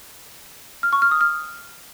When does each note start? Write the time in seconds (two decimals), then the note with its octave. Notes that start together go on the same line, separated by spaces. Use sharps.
0.83 F6
0.93 C#6
1.02 F6
1.11 D#6
1.21 F6